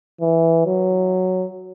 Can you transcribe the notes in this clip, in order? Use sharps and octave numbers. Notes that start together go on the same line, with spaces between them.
E3
F#3